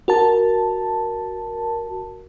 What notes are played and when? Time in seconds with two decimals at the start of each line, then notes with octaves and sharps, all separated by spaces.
0.08 F#4 A#4 A5